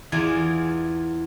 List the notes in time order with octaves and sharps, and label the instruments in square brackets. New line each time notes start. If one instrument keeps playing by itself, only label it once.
[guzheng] E2 E3 F4 D5 G#5